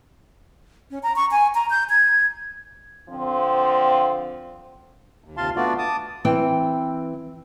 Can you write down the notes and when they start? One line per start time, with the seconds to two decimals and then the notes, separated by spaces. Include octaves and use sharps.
0.91 C#4
1.03 A#5
1.16 C#6
1.31 G#5
1.55 A#5
1.70 G6
1.90 G#6
3.09 D3 F3 C4
5.24 D#2
5.37 D#2 C3 F4 F5 A5 C6
5.56 A3 B3 D4 F4 F#4 D5
5.78 A5 D6 D#6
6.25 E3 C4 G5